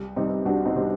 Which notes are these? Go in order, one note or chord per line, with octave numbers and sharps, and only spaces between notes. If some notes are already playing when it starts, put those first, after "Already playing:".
Already playing: C2
C3 G3 C4 D#4
C2 D4 F#4
C4 D#4
C3 G3 C4